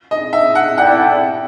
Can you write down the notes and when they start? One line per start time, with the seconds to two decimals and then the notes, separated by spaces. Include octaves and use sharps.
0.11 D#5
0.33 E5
0.55 F#5
0.78 E4 A4 D5 F#5 G5